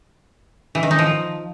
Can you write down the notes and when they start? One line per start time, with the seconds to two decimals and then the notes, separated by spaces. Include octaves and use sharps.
0.75 E3
0.83 D#3
0.91 D#4
0.99 F3